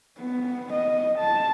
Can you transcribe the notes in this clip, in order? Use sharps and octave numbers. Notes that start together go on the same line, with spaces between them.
B3
D#5
A5